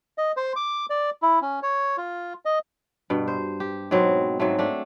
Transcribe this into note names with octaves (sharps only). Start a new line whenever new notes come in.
D#5
C5
D6
D5
E4
C#4
C#5
F4
D#5
G2 B2
C5
G4
G#2 B2 F#3 C4
G#2 F#3 A3
A3 D4